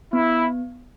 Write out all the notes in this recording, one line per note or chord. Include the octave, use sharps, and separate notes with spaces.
B3 E4